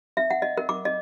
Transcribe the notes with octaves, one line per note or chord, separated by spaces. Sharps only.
E5
F#5
D#5
A#4
D6
D#5